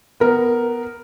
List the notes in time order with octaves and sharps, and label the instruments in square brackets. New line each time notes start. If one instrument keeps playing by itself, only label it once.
[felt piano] B3 A#4